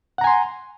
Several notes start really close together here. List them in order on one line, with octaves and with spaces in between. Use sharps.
F#5 A#5 G#5 C6